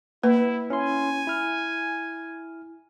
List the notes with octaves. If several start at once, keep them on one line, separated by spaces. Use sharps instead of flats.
A#3 E4 B4
C#4 E4 G#5 C6
E4 F6